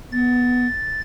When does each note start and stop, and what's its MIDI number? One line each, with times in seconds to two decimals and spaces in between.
0.12 0.67 59
0.12 1.01 93